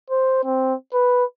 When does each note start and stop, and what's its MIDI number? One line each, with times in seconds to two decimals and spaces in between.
0.10 0.42 72
0.44 0.74 60
0.94 1.25 71